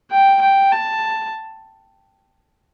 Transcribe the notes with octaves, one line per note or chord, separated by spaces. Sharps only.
G5
G5
A5